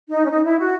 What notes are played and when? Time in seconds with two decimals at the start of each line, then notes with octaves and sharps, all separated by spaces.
0.10 D#4
0.26 C#4
0.30 D#4
0.44 E4
0.59 F#4